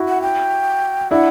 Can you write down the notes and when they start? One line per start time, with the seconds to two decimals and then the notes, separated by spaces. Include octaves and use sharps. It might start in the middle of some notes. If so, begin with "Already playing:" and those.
Already playing: E4 F#4
0.08 F#5
0.22 G5
1.11 D4 E4 F#5